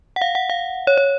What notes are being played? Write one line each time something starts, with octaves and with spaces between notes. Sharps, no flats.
F#5
F5
F#5
F5
C#5
C#5